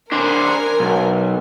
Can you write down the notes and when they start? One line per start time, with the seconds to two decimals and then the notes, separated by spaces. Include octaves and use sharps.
0.12 D4 A#4 C5 G#5
0.80 B1